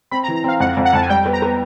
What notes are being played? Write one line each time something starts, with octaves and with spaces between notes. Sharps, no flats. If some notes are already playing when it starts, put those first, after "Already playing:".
C4 B5
A#5
E3
A#5
C4 F5
F2 F#5
F2
F#5
F2 A5
G#5
G3 G5
B3
A#5
B3